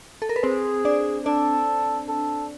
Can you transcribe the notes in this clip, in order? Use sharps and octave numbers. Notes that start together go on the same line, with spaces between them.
A4
A#4
B4
C4 G#4 C5
D4 D5
D4 A4 D5
A4